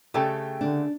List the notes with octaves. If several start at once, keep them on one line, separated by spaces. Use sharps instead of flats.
C#3 A3 G4 A4 G5
D3 D4